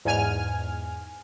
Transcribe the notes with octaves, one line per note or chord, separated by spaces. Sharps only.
E2 G#2 G#5 F6